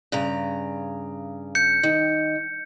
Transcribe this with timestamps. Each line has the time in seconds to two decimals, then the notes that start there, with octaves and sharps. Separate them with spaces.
0.12 G2 C#3 A#5
1.55 G6 C#7
1.83 D#3